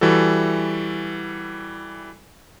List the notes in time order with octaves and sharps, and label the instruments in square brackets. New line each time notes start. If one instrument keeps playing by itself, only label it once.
[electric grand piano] E3 G3 F#4 A4